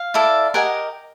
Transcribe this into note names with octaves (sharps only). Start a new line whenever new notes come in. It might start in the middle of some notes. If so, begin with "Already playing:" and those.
Already playing: F5
E4 A4 D5
G4 A#4 D#5 F#5 G#5